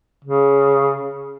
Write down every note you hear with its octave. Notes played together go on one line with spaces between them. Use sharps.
C#3